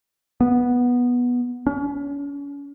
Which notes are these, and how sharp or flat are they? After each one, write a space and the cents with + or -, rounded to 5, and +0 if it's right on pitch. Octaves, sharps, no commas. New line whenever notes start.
B3 -10
C#4 +40